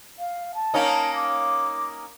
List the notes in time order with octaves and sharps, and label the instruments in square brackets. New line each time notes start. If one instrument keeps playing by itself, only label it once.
[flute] F5
A5
[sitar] A#3 C#4 D#4
[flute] D6